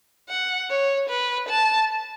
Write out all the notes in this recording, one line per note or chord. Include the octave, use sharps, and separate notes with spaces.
F#5
C#5
B4
A5